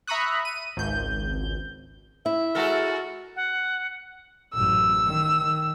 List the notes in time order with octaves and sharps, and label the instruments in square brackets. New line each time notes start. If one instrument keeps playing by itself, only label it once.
[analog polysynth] E5 A#5 B5 C#6 D#6 F#6
D#7
G#1 C#2 G6
[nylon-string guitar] E4 [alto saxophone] E5
[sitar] G#3 A4 A#4 [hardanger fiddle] F#4
[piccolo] F#5
[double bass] A1 F#2 [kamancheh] E6
[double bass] D#3
D#3